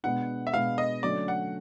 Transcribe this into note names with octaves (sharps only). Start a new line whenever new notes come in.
B2 G#3 B3 D4 F#5
E5
B2 G#3 B3 D4 F5
D#5
D3 F#3 A3 C#4 D5
F#5